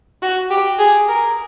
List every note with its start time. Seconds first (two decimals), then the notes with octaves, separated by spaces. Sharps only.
0.22 F#4
0.50 G4
0.79 G#4
1.08 A#4